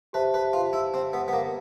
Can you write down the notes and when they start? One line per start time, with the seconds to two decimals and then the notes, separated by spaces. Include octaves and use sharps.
0.13 G4 B4 C5 E5 A5
0.34 B4
0.53 F4
0.73 E4
0.94 C4
1.13 B3
1.28 B3
1.33 A#3